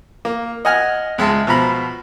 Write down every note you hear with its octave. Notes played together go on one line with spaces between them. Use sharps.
A#3
D#5 F#5 G#5 F6
C#2 G#3 E5 A5
B2 F3 A#5 B5